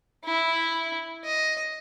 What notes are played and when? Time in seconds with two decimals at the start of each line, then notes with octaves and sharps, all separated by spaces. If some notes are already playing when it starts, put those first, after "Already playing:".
0.24 E4
1.24 D#5